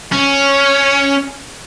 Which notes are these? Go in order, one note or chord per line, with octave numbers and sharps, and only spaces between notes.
C#4